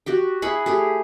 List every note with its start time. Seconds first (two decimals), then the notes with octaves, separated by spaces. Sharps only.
0.06 F#4 G4 G5
0.42 E4 G#4 F#5 B5
0.66 A3 G4 G#4